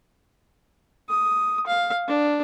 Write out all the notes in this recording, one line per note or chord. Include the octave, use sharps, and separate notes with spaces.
D#6
F5
D4